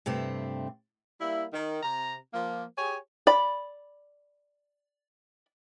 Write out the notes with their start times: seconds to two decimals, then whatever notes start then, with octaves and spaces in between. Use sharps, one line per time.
0.06 G2 C3 A3 C4
1.21 G3 A#3 E4
1.53 D#3
1.83 C3 A#5
2.34 F3 A#3
2.78 G4 G#4 C#5 G#5
3.27 D5 B5